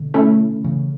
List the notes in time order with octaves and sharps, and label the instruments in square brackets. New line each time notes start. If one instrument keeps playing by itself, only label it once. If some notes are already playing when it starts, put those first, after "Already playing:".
Already playing: [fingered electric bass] B2 D3
[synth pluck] A3 C#4 E4
[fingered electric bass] C#3 E3